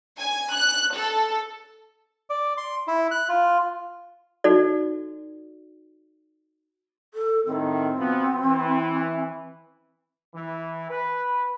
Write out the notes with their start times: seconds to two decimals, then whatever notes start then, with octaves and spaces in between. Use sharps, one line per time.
0.19 G#5
0.54 F#6
0.95 A4
2.30 D5
2.57 C6
2.87 E4
3.11 F#6
3.29 F4
4.44 D#4 F#4 A4 D5
7.14 A4
7.47 A2 D#3 C4
7.97 B2 F3 B3
8.44 E3
10.34 E3
10.89 B4